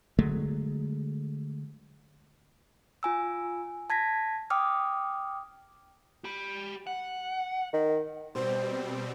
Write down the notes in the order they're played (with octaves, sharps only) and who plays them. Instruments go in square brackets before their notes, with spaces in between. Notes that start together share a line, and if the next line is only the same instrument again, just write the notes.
[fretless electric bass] D3 F#3 G#3 A3
[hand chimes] F4 G#5 E6
A5 G#6 A#6 B6
G5 D6 D#6 F6
[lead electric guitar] G4 B5
F#5
[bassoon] D#3
[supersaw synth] B2 G3 C4 [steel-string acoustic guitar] C5